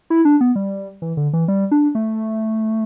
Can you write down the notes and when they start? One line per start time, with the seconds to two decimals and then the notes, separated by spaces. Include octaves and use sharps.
0.10 E4
0.25 D4
0.41 B3
0.56 G3
1.02 E3
1.17 D3
1.33 E3
1.48 G3
1.71 D4
1.95 A3